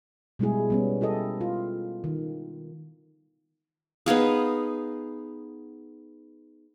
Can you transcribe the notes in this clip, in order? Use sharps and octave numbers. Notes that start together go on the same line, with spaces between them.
B2 G3 G#3 E4 G#4
G3 B3 C#4
E4 G4 A4 D#5
F4
D#3
B3 D#4 G#4 F5